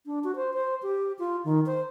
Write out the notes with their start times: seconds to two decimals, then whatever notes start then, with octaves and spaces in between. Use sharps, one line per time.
0.06 D4
0.24 F#4
0.36 C5
0.54 C5
0.83 G4
1.19 F4
1.44 D#3
1.66 C5